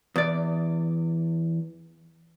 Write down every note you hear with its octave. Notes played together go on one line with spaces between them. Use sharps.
E2 D5